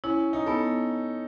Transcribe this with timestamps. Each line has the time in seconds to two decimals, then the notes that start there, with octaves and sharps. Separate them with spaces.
0.04 C#4 E4
0.33 D#4
0.46 B3 A4